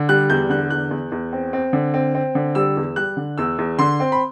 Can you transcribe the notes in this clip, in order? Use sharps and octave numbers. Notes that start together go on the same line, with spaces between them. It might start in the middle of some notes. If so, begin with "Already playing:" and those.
Already playing: D3
G3 F#6
E2 G6
D3 F#6
E2 F#6
E2
E2
C4
C4
D3
C4
C4
D3
G3 E6
E2
G3 F#6
D3
E2 E6
E2
D3 C6
C4
B5